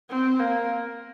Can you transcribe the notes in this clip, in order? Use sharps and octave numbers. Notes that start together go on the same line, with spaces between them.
C4
A#3